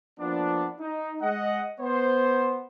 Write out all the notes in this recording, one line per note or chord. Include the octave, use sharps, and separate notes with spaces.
F3 A#3 B3 D4
D#4
G#3 D#5 F#5
B3 C5